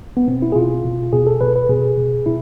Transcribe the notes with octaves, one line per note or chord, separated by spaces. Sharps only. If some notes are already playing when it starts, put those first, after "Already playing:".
B3
B2 C4
E4
G#4
B2 F4
B2
B2 G#4
A4
B2 B4
B4
B2 G#4
B2
B2 E4